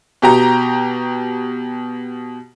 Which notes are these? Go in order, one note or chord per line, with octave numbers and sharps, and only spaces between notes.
B2 G4 A#5